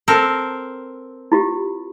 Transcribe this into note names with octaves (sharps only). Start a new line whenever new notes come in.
C4 A4 A#4
E4 F4 G4